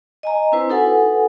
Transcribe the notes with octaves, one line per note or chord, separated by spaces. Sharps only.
D#5 G#5 A#5
C4 D4 E4 B4 C5
D#4 F#4 A4 B4 F#5 G#5